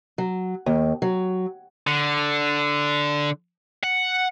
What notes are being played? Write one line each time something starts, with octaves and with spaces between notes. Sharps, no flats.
F#3
D#2
F#3
D3
F#5